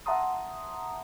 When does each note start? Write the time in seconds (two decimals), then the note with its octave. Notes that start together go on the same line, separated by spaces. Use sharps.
0.06 E5 F#5 A5 A#5 C6 D#6